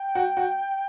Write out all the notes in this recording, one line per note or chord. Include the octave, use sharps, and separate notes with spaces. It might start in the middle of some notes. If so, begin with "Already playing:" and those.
Already playing: G5
F#4
F#4